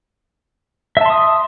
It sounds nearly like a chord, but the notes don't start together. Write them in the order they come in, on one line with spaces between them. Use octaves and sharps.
E5 A5 C6 D#6